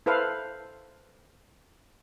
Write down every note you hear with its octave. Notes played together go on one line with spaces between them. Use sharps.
E4 A4 B4 C5 F5